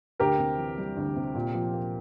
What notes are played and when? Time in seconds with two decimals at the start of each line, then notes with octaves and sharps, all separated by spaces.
0.19 D2 G4 A#4
0.39 C3
0.58 E3
0.78 G3
0.97 D2
1.16 C3
1.35 A#2
1.54 F3
1.73 A#3